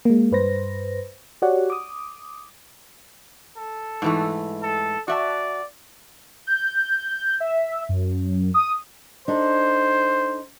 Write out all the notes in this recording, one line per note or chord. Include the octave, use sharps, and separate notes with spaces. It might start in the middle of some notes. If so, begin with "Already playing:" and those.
G#3 A#3
G2 B4 C5 A#6
F#4 G4 C#5 D5 F#5
D6 D#6
A4
G#2 E3 A3
A4
F#4 D5 E5 A5
G6
E5
F#2
D#6
D4 D#4 A4 C5